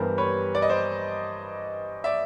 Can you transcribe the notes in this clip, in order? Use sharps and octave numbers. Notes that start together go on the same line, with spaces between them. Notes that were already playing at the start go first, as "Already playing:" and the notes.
Already playing: G2 E3 G3 B3 A#4 C5
B4 C#5
D5
D#5
C5 D5
D5 E5